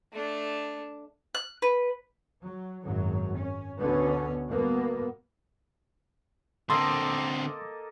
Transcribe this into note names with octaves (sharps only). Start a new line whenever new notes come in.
A3 D4
F#6
B4
F#3
G#1 F#2 F#3
C#4
D2 B2 D3 B3 C#4
G2 B2 A#3 B3
D3 A#3 C4 A4 D#5 C6